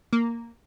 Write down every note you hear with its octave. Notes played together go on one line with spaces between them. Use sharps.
A#3